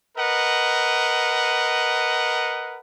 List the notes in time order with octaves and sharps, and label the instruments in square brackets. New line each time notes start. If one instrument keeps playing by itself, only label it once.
[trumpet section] A#4 B4 D#5 F#5